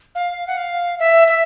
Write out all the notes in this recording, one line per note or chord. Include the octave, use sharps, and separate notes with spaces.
F5
F#5
F5
E5
E5